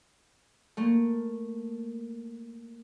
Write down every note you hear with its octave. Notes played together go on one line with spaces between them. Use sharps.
A3 A#3